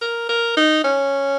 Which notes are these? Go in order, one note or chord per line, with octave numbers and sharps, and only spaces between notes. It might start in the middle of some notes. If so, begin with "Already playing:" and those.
A#4
A#4
D#4
C#4